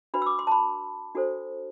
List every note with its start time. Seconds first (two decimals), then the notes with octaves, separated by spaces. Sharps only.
0.14 D4 F#4 B4 B5
0.22 E6
0.26 D6
0.39 C6
0.47 A5
0.52 B5
1.15 D4 F#4 A4 C5